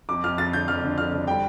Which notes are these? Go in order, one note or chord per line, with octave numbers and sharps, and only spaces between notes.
F2 D6
F2 F6
F2 A6
D3 G6
F2 F6
D3
F2 F6
D3
G3 G5